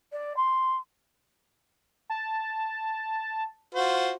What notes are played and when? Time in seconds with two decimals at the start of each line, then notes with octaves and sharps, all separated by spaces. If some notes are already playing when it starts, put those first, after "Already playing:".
0.12 D5
0.37 C6
2.10 A5
3.75 F4 F#4 C5